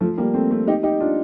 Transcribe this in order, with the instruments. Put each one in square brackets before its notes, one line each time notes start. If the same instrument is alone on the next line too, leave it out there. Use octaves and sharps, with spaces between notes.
[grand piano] F3 A3
G3 A#3
A3 C4
A3 C4
D#4 G4
D#4 G4
D4 F4